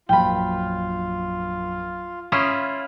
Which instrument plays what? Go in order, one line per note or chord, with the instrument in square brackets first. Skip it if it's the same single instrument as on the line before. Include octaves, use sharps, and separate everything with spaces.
[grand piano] A#1 F#2 [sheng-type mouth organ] F4 [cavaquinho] G5 B5
[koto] C#4 E4 F4 [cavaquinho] D#6